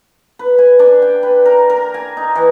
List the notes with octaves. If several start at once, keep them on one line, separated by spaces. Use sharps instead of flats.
B4
G#5
D4
G5
B4
A#4
A#4
G#5
D#4
E3